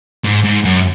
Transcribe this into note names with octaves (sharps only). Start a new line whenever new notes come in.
G#2
G#2
F#2